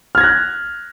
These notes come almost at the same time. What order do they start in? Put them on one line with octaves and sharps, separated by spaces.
F6 G#6 A#6 F#6